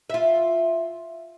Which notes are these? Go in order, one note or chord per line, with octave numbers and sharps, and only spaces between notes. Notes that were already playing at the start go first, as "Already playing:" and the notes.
F4 E5